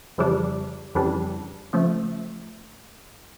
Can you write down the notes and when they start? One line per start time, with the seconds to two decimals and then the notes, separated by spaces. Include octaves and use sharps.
0.18 F2 C#3 E3 G3 D4
0.95 F2 C#3 E3 G3 D4
1.73 C#3 F3 A3